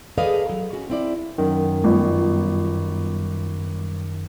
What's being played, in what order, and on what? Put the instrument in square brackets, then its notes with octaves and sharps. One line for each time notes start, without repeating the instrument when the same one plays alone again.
[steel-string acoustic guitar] G#4 A4 B4 D5 D#5 F5
F#3
C#4 F#4
C4 E4 D5
[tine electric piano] F#2 D#3
[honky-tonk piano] G1